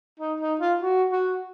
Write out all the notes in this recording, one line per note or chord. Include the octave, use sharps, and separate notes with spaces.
D#4
D#4
F4
F#4
F#4